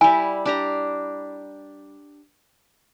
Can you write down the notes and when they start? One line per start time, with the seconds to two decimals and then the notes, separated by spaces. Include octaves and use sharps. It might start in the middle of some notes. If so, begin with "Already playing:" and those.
0.01 G3 E4 G#5
0.46 D4 G4 A#5